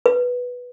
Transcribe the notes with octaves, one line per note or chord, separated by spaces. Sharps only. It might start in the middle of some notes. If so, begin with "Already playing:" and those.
B4